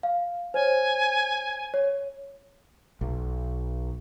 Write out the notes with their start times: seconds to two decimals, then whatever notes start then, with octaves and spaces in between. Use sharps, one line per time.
0.03 F5
0.54 C5 C#5 G#5
1.74 C#5
3.01 B1